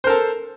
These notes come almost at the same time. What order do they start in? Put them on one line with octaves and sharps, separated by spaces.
C5 A#4 A4